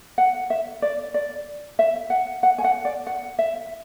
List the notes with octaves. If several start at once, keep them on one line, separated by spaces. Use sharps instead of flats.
F#5
E5
D5
D5
E5
F#5
F#5
G#5
F#5
D5
F#5
E5